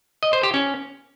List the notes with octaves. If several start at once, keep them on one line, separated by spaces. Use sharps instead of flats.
D#5
C5
G4
C#4